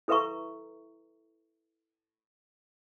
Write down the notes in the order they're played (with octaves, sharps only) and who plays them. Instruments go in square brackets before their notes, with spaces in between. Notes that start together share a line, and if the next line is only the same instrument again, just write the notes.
[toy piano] E4 A4 B4 E5 A#5 C#6